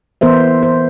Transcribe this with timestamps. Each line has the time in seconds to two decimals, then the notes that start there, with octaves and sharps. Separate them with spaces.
0.21 E3 B3 A#4 C5 E5
0.63 C5